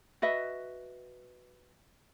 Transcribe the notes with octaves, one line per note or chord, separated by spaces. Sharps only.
F#4 B4 D#5 E5